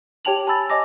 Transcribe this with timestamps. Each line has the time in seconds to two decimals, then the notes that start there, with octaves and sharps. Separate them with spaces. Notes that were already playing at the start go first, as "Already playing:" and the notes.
0.25 G4 C#5 G5 A5 F7 F#7
0.47 G#5 A5 B5 E6 A6
0.70 C#5 D#5 G#5 D6 A#6